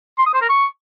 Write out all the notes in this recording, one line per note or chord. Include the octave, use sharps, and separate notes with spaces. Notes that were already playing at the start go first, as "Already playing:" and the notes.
C6
D#6
C5
A#4
C#6